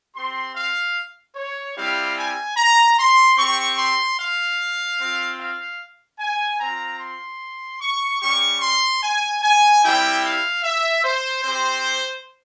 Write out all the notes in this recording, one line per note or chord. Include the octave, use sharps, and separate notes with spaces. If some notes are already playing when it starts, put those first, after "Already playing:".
C4 G4 C6
F5
C#5
G3 C4 E4 G4 F5
G#5
A#5
C6
C4 G4 C#6
C6
F5
C4 F4
F5
G#5
C4 F4 A#5
C6
C#6
G3 C#4 G4 C#6
C6
G#5
G#5
G3 C4 E4 G4 G5
F5
E5
C5
C4 G4 C5